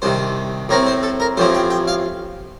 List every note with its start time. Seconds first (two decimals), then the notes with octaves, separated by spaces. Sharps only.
0.02 C2 C3 D#3 C5
0.69 A2 A3 C4 A#4
0.87 C5
1.03 A4
1.20 A#4
1.37 A1 A2 F3 C4 C5
1.55 G5
1.71 G5
1.88 F5